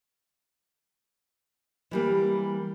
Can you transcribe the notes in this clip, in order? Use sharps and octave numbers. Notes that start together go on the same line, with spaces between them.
E3 G3 A#3